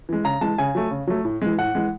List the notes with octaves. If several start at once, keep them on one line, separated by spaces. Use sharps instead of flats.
E3 G#3
C#3 A#5
E3 G#3 A5
C#3 G#5
F#3 A3
C#3
F#3 A3
A2
E3 G#3
A2 F#5
E3 G#3